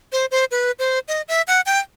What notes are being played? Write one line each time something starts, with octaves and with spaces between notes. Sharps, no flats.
C5
C5
B4
C5
D#5
E5
F#5
G5